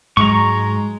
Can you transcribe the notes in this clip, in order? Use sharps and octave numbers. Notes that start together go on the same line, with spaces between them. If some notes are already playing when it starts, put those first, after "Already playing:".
G#2 F#3 G#3 A#5 C#6